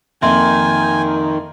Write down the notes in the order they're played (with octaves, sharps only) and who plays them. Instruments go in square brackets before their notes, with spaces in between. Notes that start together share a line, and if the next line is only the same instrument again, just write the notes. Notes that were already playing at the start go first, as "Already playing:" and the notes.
[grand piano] F2 A#3 [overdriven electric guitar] D#3 [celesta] E5 C6 [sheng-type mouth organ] G#5